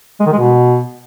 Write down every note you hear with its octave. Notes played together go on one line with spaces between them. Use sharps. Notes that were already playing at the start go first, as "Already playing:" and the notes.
G#3
D#3
G#3
B2